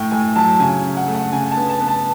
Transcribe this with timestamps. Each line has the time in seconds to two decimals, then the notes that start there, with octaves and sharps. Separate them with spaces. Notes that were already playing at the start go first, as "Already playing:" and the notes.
Already playing: A2 G5
0.11 A2 G#5
0.36 F#3 A5
0.60 C#3 G#5
0.84 C#3
0.97 F#5
1.08 A3
1.14 F#5
1.33 C#3 G#5
1.52 A5
1.57 B3
1.70 A5
1.81 B3
1.88 A5